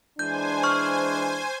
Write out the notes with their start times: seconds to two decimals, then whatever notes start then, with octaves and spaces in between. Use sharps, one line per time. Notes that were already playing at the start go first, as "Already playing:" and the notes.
0.19 E3 G#3 D4 C5 G#5 G6
0.63 C#6 F6